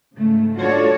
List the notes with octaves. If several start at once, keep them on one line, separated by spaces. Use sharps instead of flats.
G#2 C#3 A3
D4 F4 F#4 A4 C#5 D5